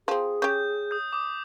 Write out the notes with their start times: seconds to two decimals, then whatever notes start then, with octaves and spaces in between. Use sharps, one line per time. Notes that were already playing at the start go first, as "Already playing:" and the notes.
0.08 F3 C4 G#4
0.42 C#4 G4 G6
0.91 D#6 G6
1.13 D6 D#6